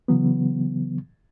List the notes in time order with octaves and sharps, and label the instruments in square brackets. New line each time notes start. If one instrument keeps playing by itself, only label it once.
[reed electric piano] C#3 E3 F#3 B3